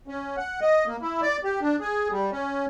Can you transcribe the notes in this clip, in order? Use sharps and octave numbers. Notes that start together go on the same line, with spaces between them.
C#4
F#5
D#5
A#3
E4
D5
G4
D4
G#4
G3
C#4